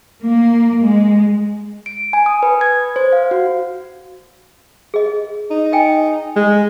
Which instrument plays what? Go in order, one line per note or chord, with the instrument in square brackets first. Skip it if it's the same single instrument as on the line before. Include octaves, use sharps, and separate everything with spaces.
[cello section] A#3
G#3
[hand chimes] D7
G#5
D#6
B4
G#6
C5
F5
F#4
[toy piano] G#4 D#5
[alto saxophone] D#4
[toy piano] D#5 G5 G#5
[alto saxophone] G#3